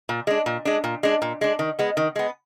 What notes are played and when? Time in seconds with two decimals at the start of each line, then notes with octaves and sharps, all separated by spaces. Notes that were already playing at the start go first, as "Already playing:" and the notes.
0.09 A#2
0.27 G#3 D4
0.46 A#2
0.65 G#3 D4
0.84 A#2
1.03 G#3 D4
1.22 A#2
1.41 G#3 D4
1.59 D#3
1.79 G#3 B3
1.97 D#3
2.16 G#3 B3